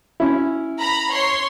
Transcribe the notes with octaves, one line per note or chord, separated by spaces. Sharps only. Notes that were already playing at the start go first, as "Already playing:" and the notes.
C#4 E4
A#5 B5
C#5 C6